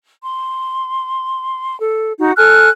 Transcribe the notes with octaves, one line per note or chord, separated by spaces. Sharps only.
C6
A4
D#4 F#4
A4 G#5 F6 F#6